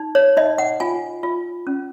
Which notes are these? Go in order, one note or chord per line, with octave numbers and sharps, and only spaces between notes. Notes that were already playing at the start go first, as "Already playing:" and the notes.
Already playing: D#4
C#5
D#4 D#5
F#5
F4 G#5
F4
C#4